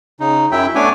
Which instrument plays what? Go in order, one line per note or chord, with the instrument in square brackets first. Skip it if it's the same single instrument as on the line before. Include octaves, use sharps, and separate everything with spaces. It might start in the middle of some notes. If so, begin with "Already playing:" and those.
[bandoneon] C#3 D#4
F#2 F#3 E4 E5 G5
A3 B3 D4 C#5 G#5 D6